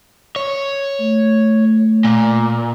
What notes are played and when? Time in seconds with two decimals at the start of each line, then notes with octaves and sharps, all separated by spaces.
0.36 C#5
1.00 A3
2.04 A#2